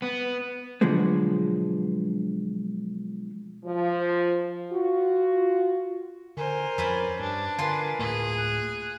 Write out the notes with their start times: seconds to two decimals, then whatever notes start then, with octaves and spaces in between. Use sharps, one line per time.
0.02 B3
0.81 B2 D3 F3 F#3 G#3 B3
3.65 F3
4.72 F4 F#4
6.37 D3 A#4 C5 G#5
6.78 F2 C#4 B4 D5
7.20 G2 D4
7.59 D3 F4 A#4 B4 G#5 C6
7.99 D2 A2 A#3 G#4
8.37 F#6